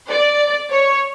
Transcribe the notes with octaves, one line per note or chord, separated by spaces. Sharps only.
D5
C#5